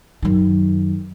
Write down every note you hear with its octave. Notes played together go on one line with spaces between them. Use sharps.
F#2 D#3